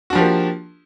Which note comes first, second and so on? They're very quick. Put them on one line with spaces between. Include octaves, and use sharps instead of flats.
F#4 D4 F3 G4 A#3